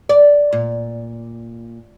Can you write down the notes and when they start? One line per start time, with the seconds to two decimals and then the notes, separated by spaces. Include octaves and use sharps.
0.09 D5
0.53 A#2